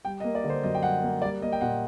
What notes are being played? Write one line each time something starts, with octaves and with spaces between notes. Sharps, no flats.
G3 G5
D#5
A#3
D5
D3
C5
F#2 D#5
G5
G3 F#5
A#3
G3 D5
A#3 D#5
G5
A#2 F#5